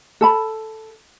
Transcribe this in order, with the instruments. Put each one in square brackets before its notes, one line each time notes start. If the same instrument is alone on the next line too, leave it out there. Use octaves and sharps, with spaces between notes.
[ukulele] A4 A5 B5